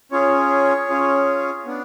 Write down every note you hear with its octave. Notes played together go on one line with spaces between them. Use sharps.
C#4 F4 G#4 C#5
C#4 F4 G#4
B3 D4